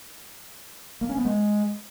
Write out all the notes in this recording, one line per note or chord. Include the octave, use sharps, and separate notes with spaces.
A#3
C#4
B3
G#3